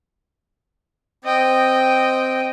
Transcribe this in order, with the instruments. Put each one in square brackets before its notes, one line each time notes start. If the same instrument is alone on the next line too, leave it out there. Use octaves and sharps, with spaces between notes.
[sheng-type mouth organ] C4 [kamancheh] D#5 G5